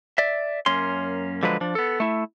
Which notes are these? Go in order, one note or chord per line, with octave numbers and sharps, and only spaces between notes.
D5 E5
F#2 A#3 C#4 C6
D3 F3 F#3 G#3 B4
F3 D4
B3 A4
A3 E4